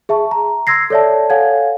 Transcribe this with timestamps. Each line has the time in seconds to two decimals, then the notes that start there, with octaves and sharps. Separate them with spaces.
0.09 G#4 E5 A5 C#6
0.31 A#5
0.67 C6 E6 G#6 A#6 C7
0.90 A4 C#5 D5 E5 A5
1.30 A4 C#5 F5 F#5 G#5 G#6